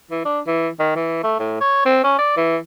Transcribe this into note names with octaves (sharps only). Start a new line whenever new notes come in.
E3
D4
E3
D#3
E3
A3
A2
C#5
C4
C#4
D5
E3